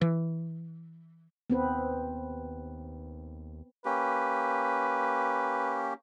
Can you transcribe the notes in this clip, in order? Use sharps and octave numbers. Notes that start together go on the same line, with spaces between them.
E3
D#2 B3 C4 B4
A#3 C#4 G4 B4